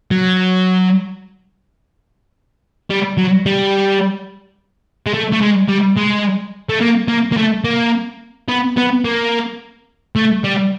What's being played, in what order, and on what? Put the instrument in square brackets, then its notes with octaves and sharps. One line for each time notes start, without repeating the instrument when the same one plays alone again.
[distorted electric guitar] F#3
G3
F#3
G3
G#3
A3
A3
G#3
G3
G#3
A3
A#3
A#3
A#3
A3
A#3
B3
B3
A#3
A3
G3